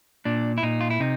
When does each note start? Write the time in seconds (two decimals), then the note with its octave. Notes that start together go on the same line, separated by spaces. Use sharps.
0.25 A#2 D4
0.58 E4
0.63 A#2 D#4
0.81 F4
0.90 E4
1.00 C3 D#4